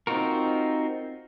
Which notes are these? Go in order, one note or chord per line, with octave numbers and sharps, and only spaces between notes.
C4 D#4 F4 F#4 A#4